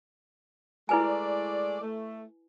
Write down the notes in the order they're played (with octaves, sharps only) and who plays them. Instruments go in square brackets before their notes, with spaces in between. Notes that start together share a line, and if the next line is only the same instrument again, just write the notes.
[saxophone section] G#3 A3 D5 [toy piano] E4 B4 G#5
[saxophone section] A3